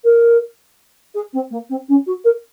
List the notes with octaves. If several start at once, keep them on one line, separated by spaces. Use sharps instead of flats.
A#4
G#4
C4
A#3
C4
C#4
F#4
A#4